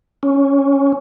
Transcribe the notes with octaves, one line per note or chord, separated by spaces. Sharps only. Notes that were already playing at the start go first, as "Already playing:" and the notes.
C#4